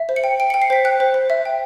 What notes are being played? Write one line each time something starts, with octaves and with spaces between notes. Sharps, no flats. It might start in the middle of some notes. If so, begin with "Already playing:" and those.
Already playing: E5
C5
C#7
G5
G5 D7
C#7
G5
C7
C5 B6
G5 F#6
C5
C5
E5
G5